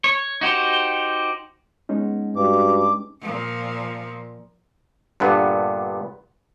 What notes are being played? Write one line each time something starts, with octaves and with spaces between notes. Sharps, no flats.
C#5
D#4 F#4 G4 C5
G#3 B3 C#4 D#4
G2 F#4 D6
A#2 F3
G2 A#2 D3 B3